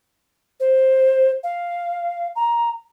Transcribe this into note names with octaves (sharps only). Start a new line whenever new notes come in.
C5
F5
A#5